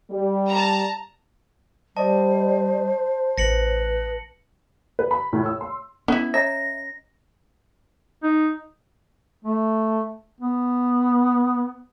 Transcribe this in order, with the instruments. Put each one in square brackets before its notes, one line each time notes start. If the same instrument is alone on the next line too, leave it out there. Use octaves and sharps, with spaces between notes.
[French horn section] G3
[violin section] A5 A#5
[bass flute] G3 [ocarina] C5 [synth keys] D5 D#5 [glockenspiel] A5
[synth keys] A1 [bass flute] B4 [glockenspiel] A#6 C#7 F#7
[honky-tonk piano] B4
B5
A2
E6
C6
[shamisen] B3 E4 [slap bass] C#4
[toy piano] C#5 D#5 A#5 [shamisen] E5 [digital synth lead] A#6
[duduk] D#4
A3
B3